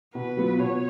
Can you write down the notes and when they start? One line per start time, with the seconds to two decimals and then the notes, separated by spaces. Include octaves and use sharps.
0.14 B2 B4
0.37 F#3 B3 F4
0.59 B2 C#5